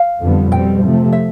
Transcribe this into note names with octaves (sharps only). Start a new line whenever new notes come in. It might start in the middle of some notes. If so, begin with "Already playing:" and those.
Already playing: F5
F2 D3 G3 B3
B2 G3 C4 G5
C3 F3 A3
E5